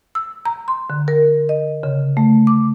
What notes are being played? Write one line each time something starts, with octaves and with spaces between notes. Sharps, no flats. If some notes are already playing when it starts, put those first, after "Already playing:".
E6
A#5
C6
D3
A#4
D#5
C#3
A3
D6